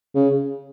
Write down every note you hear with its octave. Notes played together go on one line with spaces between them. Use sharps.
C#3